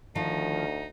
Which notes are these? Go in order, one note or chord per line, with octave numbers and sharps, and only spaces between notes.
D2 D#3 F3 D#4